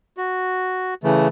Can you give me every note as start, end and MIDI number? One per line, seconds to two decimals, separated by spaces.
0.17 0.94 66
1.04 1.28 49
1.04 1.28 52
1.04 1.28 57